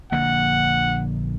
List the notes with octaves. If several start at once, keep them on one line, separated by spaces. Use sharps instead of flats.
A#1 D3 A#3 F#5